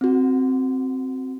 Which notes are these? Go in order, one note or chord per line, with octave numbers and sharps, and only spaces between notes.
C4 F#4